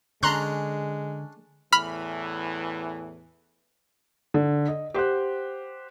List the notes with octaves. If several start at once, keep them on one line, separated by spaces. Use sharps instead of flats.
D3 G#3 C#4 D4 A#5 C6 F#6
E2 A2 E3 B5 F6 B6
D3
D#5
G4 C5 F#5 F#6